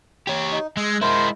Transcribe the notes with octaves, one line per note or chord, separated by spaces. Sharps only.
G4 C#5
D#4
G#3 E6 F#6
G#3 E4 A#4 C5